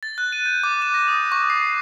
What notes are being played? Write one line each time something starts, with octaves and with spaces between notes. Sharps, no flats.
A6
F#6
D#7
G6
D6
E7
A#6
D#6
C#6
C7